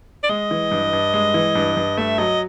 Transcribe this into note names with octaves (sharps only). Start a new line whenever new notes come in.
D5
G#3 D#5
E3
G2
G2
G#3
E3
G2
G2
A3 E5
F#3 D#5